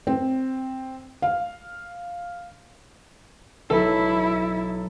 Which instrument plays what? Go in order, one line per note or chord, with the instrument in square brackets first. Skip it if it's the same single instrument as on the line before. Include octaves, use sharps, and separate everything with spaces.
[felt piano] C4
F5
[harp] B1 [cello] E4 [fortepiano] A4